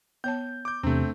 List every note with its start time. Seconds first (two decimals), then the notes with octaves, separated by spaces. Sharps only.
0.24 B3 C#5 A5 G6
0.65 D6 G6
0.83 E2 C3 A3 C4 D4